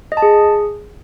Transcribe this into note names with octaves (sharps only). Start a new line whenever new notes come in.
D#5
A5
G#4